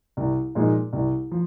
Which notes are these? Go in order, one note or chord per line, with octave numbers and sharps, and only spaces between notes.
C2
A#2 F3 G#3 D#4
C2
F3